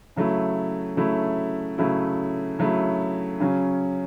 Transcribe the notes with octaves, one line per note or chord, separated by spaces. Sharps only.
C#3 F#3 A3 E4
C#3 F#3 A3 E4
C#3 F#3 A3 E4
C#3 F#3 A3 E4
C#3 F#3 C#4